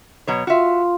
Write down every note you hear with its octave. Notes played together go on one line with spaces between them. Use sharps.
B2 F#3 C#5
F4 F#4 E5 F5 C6